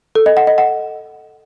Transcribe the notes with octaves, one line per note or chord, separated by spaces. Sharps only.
A4
D#5
F#5
D#5
F#5